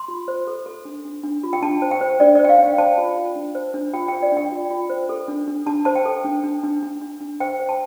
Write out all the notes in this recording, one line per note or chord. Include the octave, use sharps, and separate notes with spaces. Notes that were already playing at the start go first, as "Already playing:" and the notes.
Already playing: C6
F4
C5
A4
A4
D4
D4
D4
F4
G5
D4 A5
C5
G5
C5
D4 D5
C5 D5
G5
F5
D4 G5
C5 A5
F4
F4
D4
C5
D4
F4 G5
C5 G5
D5
D4
G5
F4
F4
C5
A4
D4
D4
D4 A5
C5 A5
G5
A4
D4
D4
D4
D4
D4
D4
C5 G5
C5
A5